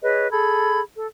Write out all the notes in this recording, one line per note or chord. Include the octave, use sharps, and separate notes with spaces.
G#4 B4 C#5 D#5
G#4 A4 B5 G#6
A4